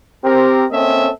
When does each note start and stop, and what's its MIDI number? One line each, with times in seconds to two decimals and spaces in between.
0.25 0.66 60
0.25 0.66 67
0.25 0.66 70
0.71 1.10 58
0.71 1.10 60
0.71 1.10 61
0.71 1.10 69
0.71 1.10 75
0.71 1.10 76